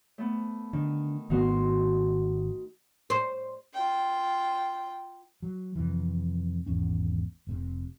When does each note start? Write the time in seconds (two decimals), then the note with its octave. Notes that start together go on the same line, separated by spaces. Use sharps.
0.18 A3 B3
0.73 D3 D#3
1.30 G#1 D#3 B3 D#4 F#4 C6
3.10 C5
3.73 F4 G5
5.43 F#3
5.76 F2 C3 E3
6.66 G#1 E2 C#4
7.47 F1 A2 C3